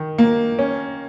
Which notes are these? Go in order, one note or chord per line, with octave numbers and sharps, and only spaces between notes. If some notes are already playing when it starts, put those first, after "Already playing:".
Already playing: D#3
A#3
C#4